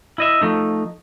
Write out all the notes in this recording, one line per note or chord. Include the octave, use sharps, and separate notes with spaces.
E4 D#5 E5
F3 A3 D#4